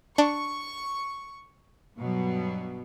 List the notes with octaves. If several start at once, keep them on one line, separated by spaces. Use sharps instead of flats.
D4 C#6
G2 B2 F#3